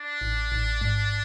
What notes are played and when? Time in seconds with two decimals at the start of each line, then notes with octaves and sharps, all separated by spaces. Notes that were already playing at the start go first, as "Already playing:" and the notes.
Already playing: D4
0.21 A1
0.52 A1
0.81 G#2